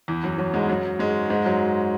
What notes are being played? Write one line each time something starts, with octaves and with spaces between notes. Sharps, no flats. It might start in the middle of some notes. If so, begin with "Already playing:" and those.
E2 E3
F#2 F#3
F#2 F#3
G#2 G#3
F#2 F#3
G#2 G#3
G#2 G#3
F#2 F#3